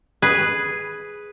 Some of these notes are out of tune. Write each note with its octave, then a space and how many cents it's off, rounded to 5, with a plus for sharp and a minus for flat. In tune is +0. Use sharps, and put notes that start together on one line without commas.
G#4 +0 B4 +0